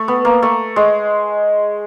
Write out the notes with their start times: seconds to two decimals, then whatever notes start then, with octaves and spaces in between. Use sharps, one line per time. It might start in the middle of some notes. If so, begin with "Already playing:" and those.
Already playing: A3
0.08 B3
0.25 A#3
0.43 A3
0.76 G#3